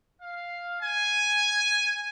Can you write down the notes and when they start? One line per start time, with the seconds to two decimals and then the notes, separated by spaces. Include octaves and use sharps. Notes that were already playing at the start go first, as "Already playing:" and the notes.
0.21 F5
0.80 G#5